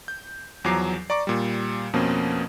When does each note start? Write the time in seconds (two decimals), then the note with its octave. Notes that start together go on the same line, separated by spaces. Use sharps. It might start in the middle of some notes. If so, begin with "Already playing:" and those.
0.08 G6
0.64 E2 F3 F#3 A#5 D6 C7
1.10 D5 A#5 C#6 D6
1.27 A#2 G3
1.93 F2 B2 F3 A#3 C4 C#4